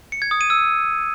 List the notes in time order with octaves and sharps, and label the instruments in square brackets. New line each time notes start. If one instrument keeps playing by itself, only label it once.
[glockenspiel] C#7
G#6
D#6
D#7
E6